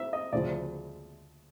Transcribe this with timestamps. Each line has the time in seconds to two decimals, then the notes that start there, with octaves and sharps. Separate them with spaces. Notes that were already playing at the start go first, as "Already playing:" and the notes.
Already playing: E5
0.13 D#5
0.32 D2 C#3 F3 D5